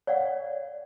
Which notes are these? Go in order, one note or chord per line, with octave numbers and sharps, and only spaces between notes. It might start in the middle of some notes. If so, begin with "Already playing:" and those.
C#5 D5 F5 F#5